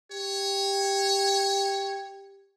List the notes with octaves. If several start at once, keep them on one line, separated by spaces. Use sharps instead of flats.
G4 C#5